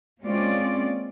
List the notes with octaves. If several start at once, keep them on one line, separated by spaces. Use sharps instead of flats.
G#3 A#3 C4 C#4 F4 D5